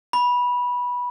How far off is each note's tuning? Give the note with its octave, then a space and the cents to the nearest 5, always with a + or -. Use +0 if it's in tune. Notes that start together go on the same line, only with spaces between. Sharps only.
B5 -15